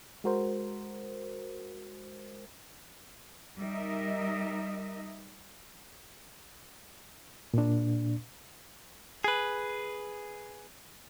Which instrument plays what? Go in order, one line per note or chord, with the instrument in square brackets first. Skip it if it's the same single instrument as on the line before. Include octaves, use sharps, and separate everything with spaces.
[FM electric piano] G#3 F#4 A#4 C5
[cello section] G3 D#4 A#4 D#5 E5
[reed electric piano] A#2 D4
[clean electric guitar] G#4 B4